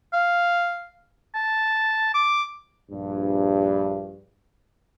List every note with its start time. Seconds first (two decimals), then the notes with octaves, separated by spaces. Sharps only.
0.13 F5
1.34 A5
2.14 D6
2.91 A#1 G2